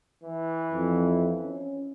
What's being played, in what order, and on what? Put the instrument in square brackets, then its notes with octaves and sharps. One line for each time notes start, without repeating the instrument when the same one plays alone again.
[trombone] E3
[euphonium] F2
C#4